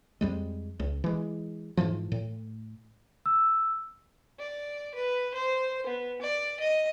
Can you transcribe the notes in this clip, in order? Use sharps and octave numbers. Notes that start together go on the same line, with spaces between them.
F2 G3 G#3
C#2
E3 G#3
G#2 C#3 E3 F3
A2
E6
D5
B4
C5
B3
D5
D#5